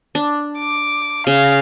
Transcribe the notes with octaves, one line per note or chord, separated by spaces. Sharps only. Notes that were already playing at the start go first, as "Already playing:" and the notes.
D4
D6
C#3 F5